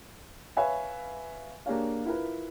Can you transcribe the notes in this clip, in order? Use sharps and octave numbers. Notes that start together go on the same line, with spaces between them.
B4 C#5 E5 F5 G#5 B5
A#3 D4 G4 G#4 C#5 F5
E4 F4 A#4 B4